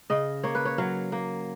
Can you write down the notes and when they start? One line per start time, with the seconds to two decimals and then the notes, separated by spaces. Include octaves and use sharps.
0.10 C#3 D#5
0.43 A#3 C#5
0.55 B4
0.65 C#5
0.78 F#3 F5
1.12 A#3